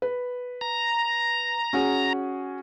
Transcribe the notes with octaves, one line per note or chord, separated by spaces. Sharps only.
B4
A#5
C#4 F#4 G#4